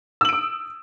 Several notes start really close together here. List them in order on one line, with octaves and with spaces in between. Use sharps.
E6 F#7 D7 D#6